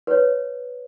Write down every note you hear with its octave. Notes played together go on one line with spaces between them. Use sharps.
B4 C#5